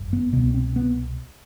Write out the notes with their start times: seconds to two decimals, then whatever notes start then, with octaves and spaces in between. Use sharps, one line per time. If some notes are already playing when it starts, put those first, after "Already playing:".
Already playing: G1 F#2
0.13 B3
0.33 C2 B2 B3
0.54 C4
0.76 B3